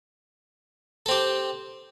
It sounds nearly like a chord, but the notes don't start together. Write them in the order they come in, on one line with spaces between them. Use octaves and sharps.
A4 C4 G4